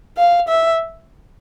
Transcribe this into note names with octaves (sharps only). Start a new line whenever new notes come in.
F5
E5